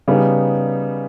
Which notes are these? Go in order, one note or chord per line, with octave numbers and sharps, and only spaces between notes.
C#3 G3 B3 D#4